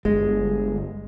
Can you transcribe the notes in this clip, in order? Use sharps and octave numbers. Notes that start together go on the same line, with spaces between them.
G1 G#3